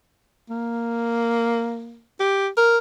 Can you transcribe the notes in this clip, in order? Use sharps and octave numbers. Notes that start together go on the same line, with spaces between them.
A#3
G4
A#4